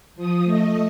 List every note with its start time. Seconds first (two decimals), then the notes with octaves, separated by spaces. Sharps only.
0.16 F3 D#6
0.44 A3 D#5